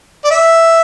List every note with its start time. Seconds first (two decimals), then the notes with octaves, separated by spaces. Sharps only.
0.24 D5
0.31 E5